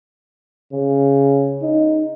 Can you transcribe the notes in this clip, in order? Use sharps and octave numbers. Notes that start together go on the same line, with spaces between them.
C#3
D#4